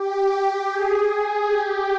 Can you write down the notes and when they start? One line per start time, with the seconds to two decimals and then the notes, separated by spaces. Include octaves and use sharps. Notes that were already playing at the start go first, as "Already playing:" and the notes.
Already playing: G4
0.70 G#4
1.09 G#4
1.48 G4